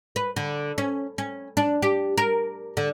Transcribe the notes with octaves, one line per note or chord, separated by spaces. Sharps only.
B4
D3
C#4
C#4
D4
G4
A#4
D3